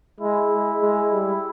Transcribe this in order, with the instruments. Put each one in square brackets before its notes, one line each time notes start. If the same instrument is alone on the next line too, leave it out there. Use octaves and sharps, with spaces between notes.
[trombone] G#3 [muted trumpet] E4
[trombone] G#3
G#3
G3